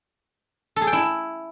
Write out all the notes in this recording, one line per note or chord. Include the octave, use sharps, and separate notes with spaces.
A4
G#4
G5
E4